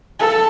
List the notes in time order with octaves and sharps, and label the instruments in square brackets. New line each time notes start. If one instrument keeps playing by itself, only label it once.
[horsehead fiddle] A4